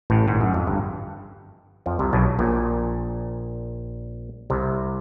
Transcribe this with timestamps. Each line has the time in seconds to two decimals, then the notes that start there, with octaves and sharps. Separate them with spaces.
0.10 A1 A2
0.28 G#1 G#2
0.41 F#2
0.54 F2
0.67 G1 G2
1.86 F2 F3
1.99 C2 C3
2.13 B1 B2
2.39 A#1 A#2
4.50 C2 C3